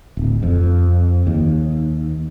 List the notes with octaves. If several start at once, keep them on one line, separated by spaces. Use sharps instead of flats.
D1
F2
D#2